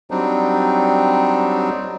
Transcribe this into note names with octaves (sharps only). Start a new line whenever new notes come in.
F#3 G3 C4 D4 D#4